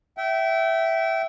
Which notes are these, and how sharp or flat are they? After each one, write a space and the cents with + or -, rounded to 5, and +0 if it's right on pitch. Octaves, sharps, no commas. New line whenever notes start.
E5 +0 G5 -30